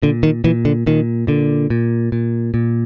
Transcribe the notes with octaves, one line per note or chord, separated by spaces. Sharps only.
A#2 D3
D#3
A#2 E3
D3
A#2 D#3
A#2 D3
A#2
A#2
A#2